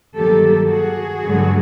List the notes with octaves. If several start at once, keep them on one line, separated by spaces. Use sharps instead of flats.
G2 D#3 F#3 A#3 G4 A4
F#4 G#4
G2 D3 F#3 A3